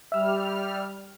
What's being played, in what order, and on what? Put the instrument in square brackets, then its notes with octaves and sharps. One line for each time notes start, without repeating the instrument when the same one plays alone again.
[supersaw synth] G3 F6 [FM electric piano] E5 E6